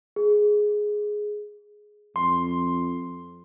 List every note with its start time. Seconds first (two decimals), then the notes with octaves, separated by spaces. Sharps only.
0.16 G#4
2.16 F2 C6